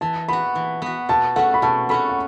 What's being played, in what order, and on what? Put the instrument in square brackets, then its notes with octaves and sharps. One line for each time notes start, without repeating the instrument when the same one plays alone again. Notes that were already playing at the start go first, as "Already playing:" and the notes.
[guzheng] E3 [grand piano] A5
[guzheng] B3 F#4 [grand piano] B5
[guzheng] E3
B3 F#4
[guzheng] B2 [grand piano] A5
[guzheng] A3 C#4 F#4 [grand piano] F#5
[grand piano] B5
[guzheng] B2 [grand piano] A5
[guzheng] A3 C#4 F#4 [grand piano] B5
[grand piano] F#5